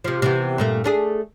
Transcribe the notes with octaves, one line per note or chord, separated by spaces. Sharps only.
C3 F3
C3 E3 B3
G2 A#2 A3
A3 D4 G#4